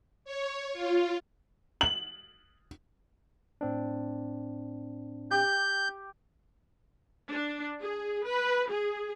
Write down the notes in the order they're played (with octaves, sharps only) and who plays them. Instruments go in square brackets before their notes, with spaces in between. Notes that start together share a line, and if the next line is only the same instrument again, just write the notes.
[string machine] C#5
F4
[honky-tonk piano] F#7
[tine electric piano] A2 C4 D4
[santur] G4 [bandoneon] G6
[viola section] D4
G#4
B4
G#4